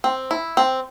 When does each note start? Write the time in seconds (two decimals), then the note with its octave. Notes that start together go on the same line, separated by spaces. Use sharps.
0.04 C4
0.31 E4
0.57 C4